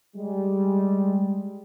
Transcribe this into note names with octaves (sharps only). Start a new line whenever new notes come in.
G3 G#3